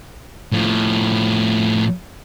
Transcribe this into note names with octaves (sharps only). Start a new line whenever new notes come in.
A2 F3